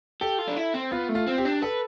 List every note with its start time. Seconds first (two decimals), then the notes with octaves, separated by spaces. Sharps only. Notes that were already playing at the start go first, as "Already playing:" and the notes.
0.21 G4 A4
0.39 F4
0.48 D4
0.57 E4
0.74 C4
0.92 B3 F4
1.09 A3
1.15 F4
1.27 C4
1.38 G4
1.45 D4
1.62 A4 B4